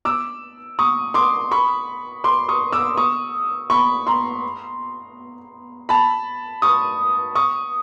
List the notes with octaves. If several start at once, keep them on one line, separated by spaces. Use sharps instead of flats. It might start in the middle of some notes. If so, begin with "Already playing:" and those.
D6 E6
C#6 D#6
C6 D6
B5 C#6
C6 D6
C#6 D#6
D6 E6
C#6 D#6
B5 C#6
A#5 C6
A5 B5
C#6 D#6
C#6 D#6